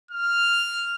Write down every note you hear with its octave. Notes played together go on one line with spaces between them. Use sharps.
F6